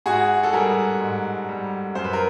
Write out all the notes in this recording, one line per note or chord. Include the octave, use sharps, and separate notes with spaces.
G#2 F#4 G#4
A4
G3 G#4 A#4
G#2
G3
F#2 C5
B4
A#4